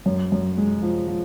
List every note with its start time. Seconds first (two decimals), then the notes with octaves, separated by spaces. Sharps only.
0.06 F#2
0.32 F#2
0.57 G#3
0.82 F3
1.08 F3